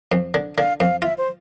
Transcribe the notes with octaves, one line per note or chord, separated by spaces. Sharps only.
F2
D3
D3 F5
F2 F5
F4 E5
C5